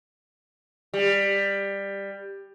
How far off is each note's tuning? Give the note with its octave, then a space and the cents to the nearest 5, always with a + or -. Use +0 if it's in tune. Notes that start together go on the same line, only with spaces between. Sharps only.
G3 +15